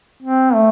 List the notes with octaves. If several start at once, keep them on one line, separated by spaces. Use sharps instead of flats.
C4
A3